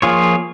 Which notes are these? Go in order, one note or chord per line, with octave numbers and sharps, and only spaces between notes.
F3 A#3 F4 G#4 C#5